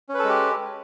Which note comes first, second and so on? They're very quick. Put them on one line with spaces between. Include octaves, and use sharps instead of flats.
C#4 B4 A4 G#3 G4